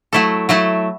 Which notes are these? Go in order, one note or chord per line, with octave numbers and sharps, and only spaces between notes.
F#3 A3 E4 A4
F#3 A3 E4 A4